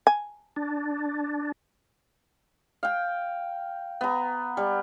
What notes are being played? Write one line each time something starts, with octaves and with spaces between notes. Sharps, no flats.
G#5
D4
F5 G5
B3 A#5
G3